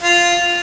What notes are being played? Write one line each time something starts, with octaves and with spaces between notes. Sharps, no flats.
F4